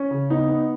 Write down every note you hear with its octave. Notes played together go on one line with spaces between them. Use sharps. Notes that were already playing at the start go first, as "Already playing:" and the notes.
Already playing: C#4
C#3
B3 D#4
B3